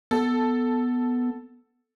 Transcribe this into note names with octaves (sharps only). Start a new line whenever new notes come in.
B3 A4